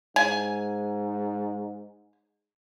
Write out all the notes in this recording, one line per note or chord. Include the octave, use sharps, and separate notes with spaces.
G#2 G#5